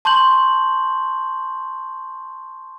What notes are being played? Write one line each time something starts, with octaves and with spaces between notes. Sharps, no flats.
A5 C6 C#6 G6 F#7